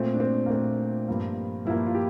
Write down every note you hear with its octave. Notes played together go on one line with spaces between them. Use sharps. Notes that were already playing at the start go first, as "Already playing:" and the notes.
Already playing: A#2 A3 C4
D4
C4
A#3
A#2 A3 C4
G2 F3 A#3
G2 F3 A#3 E4
F4
G4